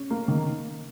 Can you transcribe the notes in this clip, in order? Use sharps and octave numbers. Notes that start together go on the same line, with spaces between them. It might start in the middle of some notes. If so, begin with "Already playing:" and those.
Already playing: C#4
A#3
D#3